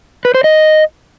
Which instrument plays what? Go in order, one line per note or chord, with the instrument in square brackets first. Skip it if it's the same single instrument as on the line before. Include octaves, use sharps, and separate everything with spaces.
[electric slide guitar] B4
C5
D#5